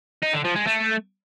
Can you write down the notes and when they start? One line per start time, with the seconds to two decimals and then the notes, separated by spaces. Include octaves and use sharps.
0.23 D#4
0.34 D3
0.45 F3
0.56 G#3
0.67 A3